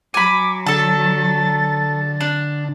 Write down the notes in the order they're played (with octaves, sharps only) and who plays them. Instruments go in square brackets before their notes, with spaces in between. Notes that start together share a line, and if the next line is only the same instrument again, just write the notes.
[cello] F#3 [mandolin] G#5 B5 [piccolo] D6
[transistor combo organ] D3 [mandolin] A4 A5 [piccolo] A6
[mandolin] D4